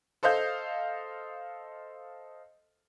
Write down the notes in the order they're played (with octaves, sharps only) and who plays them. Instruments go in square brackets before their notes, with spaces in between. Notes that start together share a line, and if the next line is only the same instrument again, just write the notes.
[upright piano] A4 C5 D#5 F5 G6